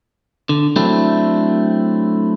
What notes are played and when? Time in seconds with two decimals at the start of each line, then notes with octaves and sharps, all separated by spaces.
0.49 D3
0.76 F#3 A3 C4 D4 E4